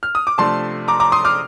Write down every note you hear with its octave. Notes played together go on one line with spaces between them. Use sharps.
F6
D#6
D6
C3 F3 A3 D4 A5 C6
A#5 D6
A#5 D6
C6 D#6
D6 F6